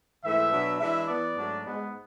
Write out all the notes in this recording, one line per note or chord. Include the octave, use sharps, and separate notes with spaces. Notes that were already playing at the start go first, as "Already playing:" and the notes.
G#2 E3 A3 E4 E5
B2 F#3 B3 D4
E3 G#3 D4 E5
E3 B3 E4 D5
G#2 F#3 A3 D4
G#2 G#3 B3